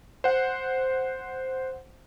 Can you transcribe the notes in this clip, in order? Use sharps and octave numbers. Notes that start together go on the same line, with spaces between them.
C5 F#5